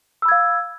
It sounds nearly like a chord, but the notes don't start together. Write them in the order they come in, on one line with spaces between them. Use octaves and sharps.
E6 B5 G#6 F5